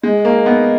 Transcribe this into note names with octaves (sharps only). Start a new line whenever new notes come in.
G#3 D#5
A#3
B3